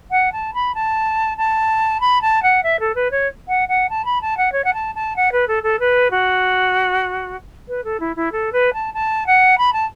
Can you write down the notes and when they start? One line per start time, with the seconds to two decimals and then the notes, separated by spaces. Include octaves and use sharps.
0.11 F#5
0.32 A5
0.54 B5
0.74 A5
1.37 A5
2.00 B5
2.21 A5
2.43 F#5
2.63 E5
2.80 A4
2.95 B4
3.11 C#5
3.48 F#5
3.68 F#5
3.89 A5
4.05 B5
4.21 A5
4.37 F#5
4.52 C#5
4.64 F#5
4.74 A5
4.95 A5
5.16 F#5
5.32 B4
5.48 A4
5.63 A4
5.79 B4
6.11 F#4
7.68 B4
7.84 A4
8.00 E4
8.16 E4
8.32 A4
8.52 B4
8.73 A5
8.94 A5
9.26 F#5
9.58 B5
9.73 A5